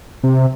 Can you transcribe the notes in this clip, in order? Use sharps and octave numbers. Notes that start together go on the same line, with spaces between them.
C3